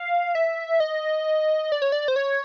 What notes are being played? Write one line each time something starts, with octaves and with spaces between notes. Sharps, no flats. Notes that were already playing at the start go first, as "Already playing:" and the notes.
Already playing: F5
E5
D#5
D5
C#5
D5
C5
C#5